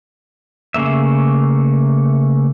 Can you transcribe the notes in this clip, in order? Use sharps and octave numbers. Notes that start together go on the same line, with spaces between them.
C#3 A3 A#3 E5